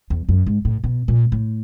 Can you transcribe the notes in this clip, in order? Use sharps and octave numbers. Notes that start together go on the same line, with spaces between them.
E2
F#2
G#2
A2
B2
A#2
A2